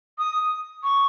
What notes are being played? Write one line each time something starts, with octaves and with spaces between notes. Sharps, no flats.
D#6
C#6